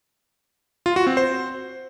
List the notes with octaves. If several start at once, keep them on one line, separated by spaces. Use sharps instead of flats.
F4
F#4
C4
C5